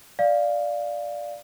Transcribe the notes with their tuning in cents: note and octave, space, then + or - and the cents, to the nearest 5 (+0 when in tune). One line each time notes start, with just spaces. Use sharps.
D5 +0 F5 +0